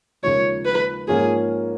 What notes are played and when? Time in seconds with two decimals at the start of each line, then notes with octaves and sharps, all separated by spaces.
0.23 D#2 C#3 F3 G#3 D#4 C#5
0.66 B4
1.08 G#2 F3 A#3 C#4 G#4